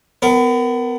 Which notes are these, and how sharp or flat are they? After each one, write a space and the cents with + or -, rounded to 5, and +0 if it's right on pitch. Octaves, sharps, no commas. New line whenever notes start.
B3 +30 A#4 +0